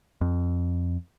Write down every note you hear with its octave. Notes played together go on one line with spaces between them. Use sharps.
F2